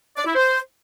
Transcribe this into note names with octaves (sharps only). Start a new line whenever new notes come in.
D5
E4
C5